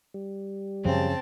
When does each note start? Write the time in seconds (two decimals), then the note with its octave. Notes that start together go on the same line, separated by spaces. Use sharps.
0.14 G3
0.85 F#2 C#3 F3 C4 A5